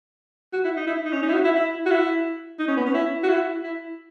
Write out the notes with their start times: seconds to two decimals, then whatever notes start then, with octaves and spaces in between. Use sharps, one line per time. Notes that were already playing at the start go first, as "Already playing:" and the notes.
0.53 F#4
0.64 E4
0.77 D#4
0.87 E4
1.05 D#4
1.13 C#4
1.23 D#4
1.28 E4
1.34 F#4
1.44 E4
1.56 E4
1.86 F#4
1.91 E4
2.59 D#4
2.68 C#4
2.77 B3
2.86 C#4
2.94 E4
3.23 F#4
3.29 E4
3.63 E4